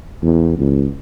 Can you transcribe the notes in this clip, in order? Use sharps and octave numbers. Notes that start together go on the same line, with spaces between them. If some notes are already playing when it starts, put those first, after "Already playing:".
E2
C#2